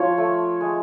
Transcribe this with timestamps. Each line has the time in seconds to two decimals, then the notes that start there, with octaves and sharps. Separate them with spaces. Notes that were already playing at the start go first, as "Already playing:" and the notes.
Already playing: F3 F4 C#5
0.18 A3
0.61 G#3